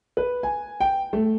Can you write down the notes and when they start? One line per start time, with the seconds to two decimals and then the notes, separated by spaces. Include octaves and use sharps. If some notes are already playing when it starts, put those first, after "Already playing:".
0.17 B4
0.43 G#5
0.81 G5
1.13 A3